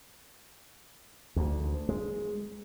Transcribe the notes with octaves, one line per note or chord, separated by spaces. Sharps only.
D2
G#3